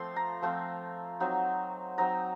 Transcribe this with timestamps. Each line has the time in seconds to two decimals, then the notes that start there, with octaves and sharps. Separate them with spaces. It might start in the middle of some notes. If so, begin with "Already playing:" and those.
Already playing: F3 A3 C4 F4 C6
0.16 A#5
0.42 F3 A3 C4 F4
1.20 F#3 C4 D#4
1.98 F#3 C4 D#4 A#5